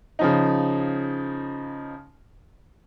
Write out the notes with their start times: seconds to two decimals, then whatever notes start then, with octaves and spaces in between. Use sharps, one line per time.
0.19 C#3 F3 D#4